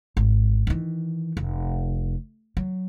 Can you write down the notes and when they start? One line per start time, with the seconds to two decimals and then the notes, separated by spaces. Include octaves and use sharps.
0.17 G#1
0.67 D#3 E3
1.37 F1
2.57 F#3